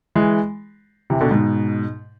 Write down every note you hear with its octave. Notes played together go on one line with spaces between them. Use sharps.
E3 G#3
C3 E3
B2 D3
G#2 B2